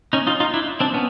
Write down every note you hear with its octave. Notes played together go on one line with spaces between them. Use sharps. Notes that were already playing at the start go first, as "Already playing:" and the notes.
C#4 D#4
D#4 F4
D#4 F4
D4 E4
C4 D4
B3 C#4